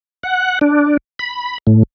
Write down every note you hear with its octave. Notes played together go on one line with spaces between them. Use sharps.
F#5
D4
B5
A2